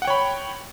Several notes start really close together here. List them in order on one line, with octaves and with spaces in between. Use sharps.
F#5 G5 C#5 B5